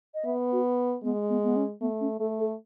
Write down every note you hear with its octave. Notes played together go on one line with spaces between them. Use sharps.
D#5
B3 E5
F#4
G#3 B3
B3
B3
C#4
A3 B3
C#4
A3 A4
A4